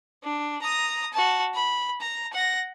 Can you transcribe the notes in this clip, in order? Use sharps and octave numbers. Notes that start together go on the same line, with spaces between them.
D4
A#5 D#6
F#4 A5
B5
A#5
F#5 A#6